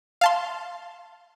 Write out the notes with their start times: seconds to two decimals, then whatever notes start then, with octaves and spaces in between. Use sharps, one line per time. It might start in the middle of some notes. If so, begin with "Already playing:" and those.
0.21 F5 A5 C6